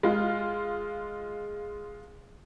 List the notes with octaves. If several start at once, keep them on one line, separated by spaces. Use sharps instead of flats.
G#3 F4